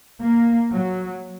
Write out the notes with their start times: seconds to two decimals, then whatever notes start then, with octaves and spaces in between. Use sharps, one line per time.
0.20 A#3
0.71 F#3